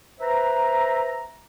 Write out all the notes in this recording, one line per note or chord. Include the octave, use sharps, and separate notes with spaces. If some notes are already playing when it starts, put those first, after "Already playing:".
B4 C5 E5 A#5